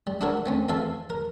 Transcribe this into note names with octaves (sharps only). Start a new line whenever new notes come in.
G3
D4 E4 F#4 A4 A#4 C#5
A3 C4 C#4
F2 E3 A4 E5 F5 A5
A#4